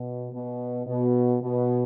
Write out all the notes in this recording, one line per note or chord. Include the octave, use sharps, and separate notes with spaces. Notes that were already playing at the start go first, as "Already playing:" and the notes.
Already playing: B2
B2
B2
B2